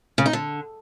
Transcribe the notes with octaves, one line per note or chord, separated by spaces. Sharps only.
C#3
D#4
D3